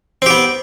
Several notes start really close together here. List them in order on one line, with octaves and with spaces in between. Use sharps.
C4 G4 B3